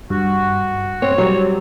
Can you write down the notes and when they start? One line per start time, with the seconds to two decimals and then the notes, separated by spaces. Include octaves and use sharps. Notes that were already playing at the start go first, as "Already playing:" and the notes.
0.10 G2 F#4
1.02 C4 C#5
1.18 F#3 G3 C4